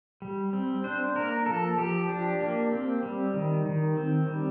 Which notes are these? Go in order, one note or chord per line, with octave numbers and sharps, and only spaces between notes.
G3
C4
D4 C5
A#3 A#4
F3 A4
F3 G4
D4
A#3
C4
G3
D#3
D#3
C4
G3